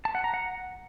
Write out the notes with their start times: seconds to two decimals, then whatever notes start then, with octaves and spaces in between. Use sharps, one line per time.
0.05 A5
0.15 F#5
0.24 A#5
0.34 F#5